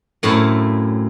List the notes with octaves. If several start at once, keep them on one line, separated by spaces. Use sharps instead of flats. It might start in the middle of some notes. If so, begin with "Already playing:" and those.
F#2 A2 C4 E4 F5 A5